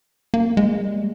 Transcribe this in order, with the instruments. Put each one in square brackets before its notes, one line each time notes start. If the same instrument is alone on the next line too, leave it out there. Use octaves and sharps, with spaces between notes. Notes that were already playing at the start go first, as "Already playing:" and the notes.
[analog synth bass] A#3
G#3
G3